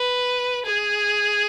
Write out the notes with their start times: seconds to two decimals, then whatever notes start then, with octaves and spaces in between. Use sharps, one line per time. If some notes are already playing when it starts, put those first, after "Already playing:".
Already playing: B4
0.66 G#4